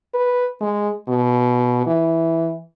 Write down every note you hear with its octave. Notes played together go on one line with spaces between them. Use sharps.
B4
G#3
B2
E3